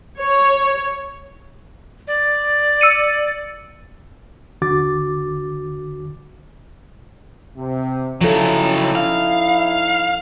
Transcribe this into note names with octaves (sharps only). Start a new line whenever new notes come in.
C#5
D5
E6 C#7 D#7
D#2 D3 F#4 D6 A6
C3
C#3 F3 F#3 C#4 D#4 E4 A4
F5